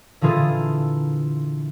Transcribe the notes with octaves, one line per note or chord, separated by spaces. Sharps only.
A#2 D3 E3 F4 G#4 A4